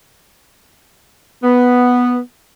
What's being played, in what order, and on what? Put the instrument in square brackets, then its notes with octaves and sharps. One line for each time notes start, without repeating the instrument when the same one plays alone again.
[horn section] B3